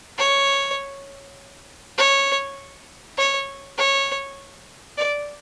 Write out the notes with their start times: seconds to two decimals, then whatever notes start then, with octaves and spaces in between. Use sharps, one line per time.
0.18 C#5
1.97 C#5
3.17 C#5
3.77 C#5
4.98 D5